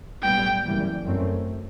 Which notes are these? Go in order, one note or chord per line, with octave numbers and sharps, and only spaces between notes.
B1 A2 G3 B3 G5
F#1 F#2 E3 G3
F#2 F#3 A3 C4